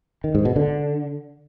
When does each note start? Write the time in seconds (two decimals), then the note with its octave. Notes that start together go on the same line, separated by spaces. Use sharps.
0.24 D#3
0.35 G#2
0.45 B2
0.56 D3